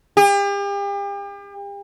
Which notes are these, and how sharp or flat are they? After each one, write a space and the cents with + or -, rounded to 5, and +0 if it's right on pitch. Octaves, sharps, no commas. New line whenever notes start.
G4 +40